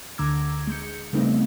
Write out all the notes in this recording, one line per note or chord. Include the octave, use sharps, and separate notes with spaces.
D2 D3 A#5 D6 E6 G#6
G#3 G6 C#7
C#3 G3 A3 B3 C4 D#4